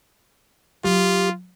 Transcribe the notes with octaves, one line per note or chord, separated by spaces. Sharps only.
F#3 F4 G4